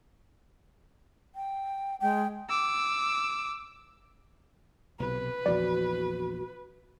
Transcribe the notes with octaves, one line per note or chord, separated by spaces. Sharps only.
G5
G#3 G5
D6 E6
B1 C3 B4
A#1 E2 F3 F#4 D5